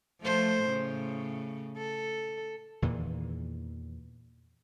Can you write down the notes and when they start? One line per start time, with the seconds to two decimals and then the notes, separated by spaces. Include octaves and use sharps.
0.21 F3 A3 C5
0.61 A2 C#3
1.77 A4
2.82 E2 A#2 D#3 E3